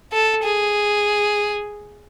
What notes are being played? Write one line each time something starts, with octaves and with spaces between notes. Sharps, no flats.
A4
G#4